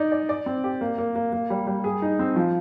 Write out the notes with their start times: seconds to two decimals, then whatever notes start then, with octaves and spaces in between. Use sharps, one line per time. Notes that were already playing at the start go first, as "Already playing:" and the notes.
Already playing: D#4 D5
0.12 D5
0.29 D5
0.46 C4
0.64 G4
0.81 A#3
0.98 A#3
1.16 A#3
1.33 A#3
1.50 G3
1.67 G3
1.84 G#4
2.02 D#4
2.19 C4
2.36 F3